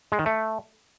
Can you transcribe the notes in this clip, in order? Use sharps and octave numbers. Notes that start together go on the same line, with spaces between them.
G#3
D#3
A3